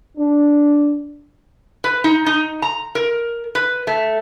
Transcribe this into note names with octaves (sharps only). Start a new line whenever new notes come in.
D4
B4
D#4
D#4
A#5
A#4
B4
A3